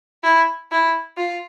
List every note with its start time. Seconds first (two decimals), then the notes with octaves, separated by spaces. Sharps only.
0.24 E4
0.72 E4
1.17 F4